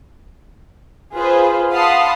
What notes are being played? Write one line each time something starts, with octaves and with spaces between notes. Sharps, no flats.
F4 G#4 B4 C5
F5 F#5 A5 B5 C6 D#6